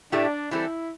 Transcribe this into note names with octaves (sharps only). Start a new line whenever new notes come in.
A2 A3 D4 E4 G4
E3 G3 C4 E4 A4